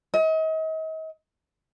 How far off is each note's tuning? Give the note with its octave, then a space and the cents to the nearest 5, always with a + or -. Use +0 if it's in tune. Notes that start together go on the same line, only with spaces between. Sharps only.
D#5 +40